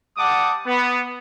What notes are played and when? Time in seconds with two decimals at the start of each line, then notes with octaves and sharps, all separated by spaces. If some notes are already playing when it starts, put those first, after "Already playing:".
0.17 G3 F#5 A5 D6 D#6
0.66 B3